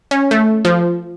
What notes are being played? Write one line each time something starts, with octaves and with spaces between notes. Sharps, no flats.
C#4
A3
F3